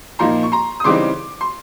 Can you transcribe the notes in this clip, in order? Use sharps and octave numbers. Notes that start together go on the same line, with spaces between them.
A#2 F3 A#3 D#4 A#5 C6
C#6
A#5 C6
D#6
C#3 E3 G3 C4 D#4 C6 D6
C6